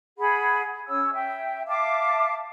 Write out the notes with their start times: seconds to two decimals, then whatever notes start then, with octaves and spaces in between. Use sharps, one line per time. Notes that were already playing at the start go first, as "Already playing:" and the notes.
0.18 G#4 F#5 B5
0.88 C#4 C#5 E6
1.14 E5 G5
1.67 E5 F5 A5 D6